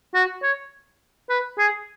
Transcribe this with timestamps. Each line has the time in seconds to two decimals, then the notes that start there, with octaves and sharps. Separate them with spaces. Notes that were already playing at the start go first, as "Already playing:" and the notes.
0.15 F#4
0.43 C#5
1.30 B4
1.58 G#4